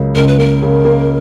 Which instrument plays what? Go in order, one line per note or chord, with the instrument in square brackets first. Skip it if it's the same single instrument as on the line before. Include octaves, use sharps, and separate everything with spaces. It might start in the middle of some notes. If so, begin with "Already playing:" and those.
Already playing: [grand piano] C#2 C#3 F#3 A#3
[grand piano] C#2 [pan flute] A#4
[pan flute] B4
[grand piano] A#3 [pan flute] A#4
[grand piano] C#3
A#3